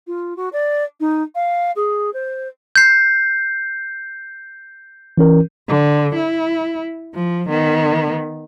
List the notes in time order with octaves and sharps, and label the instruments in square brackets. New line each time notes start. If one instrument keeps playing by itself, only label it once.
[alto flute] F4
F#4
D5
D#4
F5
G#4
C5
[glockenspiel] G6 C7
[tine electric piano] E3 C#4 A#4
[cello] D3
E4
F3
D#3 B3